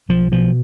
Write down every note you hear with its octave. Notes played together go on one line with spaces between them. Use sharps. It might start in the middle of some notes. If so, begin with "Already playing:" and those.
B1 F3
B2 F3